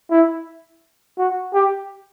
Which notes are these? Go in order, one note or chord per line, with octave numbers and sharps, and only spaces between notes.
E4
F#4
G4